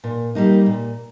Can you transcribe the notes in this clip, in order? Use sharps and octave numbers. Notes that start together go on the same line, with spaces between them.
A#2
G3 A#3 D#4
A#2